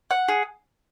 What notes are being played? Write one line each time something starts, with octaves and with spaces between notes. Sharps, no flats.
F#5
G#4